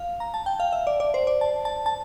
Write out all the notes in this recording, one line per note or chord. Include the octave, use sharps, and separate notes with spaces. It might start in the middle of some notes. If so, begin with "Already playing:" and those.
Already playing: F5
A#5
A5
G5
F5
E5
D5
D5
C5
D5
A5
A5
A5